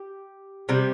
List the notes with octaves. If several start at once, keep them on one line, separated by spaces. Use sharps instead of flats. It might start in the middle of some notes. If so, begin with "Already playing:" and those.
Already playing: G4
C3 G3